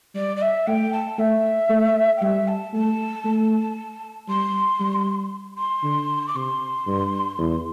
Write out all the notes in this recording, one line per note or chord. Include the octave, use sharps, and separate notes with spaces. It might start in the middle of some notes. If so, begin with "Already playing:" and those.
G3 D5
D5
E5
A3 G5
A5
A3 E5
A3
G5
G3 E5
A5
A3 A5
A3
G3 C6
G3
C6
D3
D6
C3 C6
G2
E2